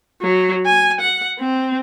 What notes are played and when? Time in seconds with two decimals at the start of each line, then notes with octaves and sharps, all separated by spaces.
0.21 F#3
0.66 G#5
1.00 F#5
1.39 C4